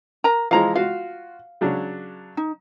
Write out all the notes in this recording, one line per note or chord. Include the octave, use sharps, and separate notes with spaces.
A#4 A#5
E3 F3 G#3 F5 A#5
F4 F#4 F5
C#3 F#3 D4
D#4